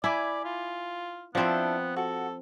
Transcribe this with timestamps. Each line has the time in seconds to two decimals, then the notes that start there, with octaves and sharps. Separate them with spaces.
0.04 E4 D5 G#5 B5 D6
0.45 F4
1.35 F3 B3 C4 D4 E4 A4
1.96 F#4 A4